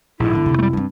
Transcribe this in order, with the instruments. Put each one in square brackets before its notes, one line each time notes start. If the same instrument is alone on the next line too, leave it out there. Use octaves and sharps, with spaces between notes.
[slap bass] A#1 G#2 [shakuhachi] E4
[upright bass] G2 B3 [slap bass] D3
[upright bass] F1 C3
[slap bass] G3 A3
[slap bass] G2 [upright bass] C4 C#4